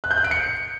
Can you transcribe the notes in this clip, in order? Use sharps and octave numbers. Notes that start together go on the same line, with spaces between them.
F#6
G6
F#6
D7
C#7